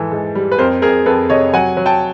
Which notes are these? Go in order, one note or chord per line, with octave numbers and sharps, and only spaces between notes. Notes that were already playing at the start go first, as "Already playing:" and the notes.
Already playing: G#2 E3 A4
G#2
G3
B4
F2 A#4 C5
F2 G#4 A#4
F2 A4 B4
C3 C#5 D#5
F#3 F#5 G#5
F#3
G5 A5